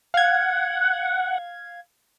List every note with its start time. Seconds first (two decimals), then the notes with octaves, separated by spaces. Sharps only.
0.14 F5 F#5 G#6